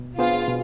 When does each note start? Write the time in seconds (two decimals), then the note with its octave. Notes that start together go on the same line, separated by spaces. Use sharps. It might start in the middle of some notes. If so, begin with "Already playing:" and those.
Already playing: B2
0.18 B3 D4 F4 G#4 C5
0.48 B2